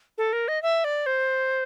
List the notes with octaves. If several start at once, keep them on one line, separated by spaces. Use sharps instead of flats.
A4
A#4
D#5
E5
D5
C5